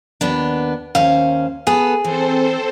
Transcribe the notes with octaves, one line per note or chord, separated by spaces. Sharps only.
D#2 B3 D4
D#2 C#4 C5 F5
B3 G#4 A4
E3 C4 A4 C5